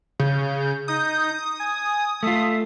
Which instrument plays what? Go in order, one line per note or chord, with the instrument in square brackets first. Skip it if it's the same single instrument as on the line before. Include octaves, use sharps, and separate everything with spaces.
[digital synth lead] C#3 [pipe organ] G6
[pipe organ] D#4 G6 [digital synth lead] D#6
[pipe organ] G#5
[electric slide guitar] A3 F4 [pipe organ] E5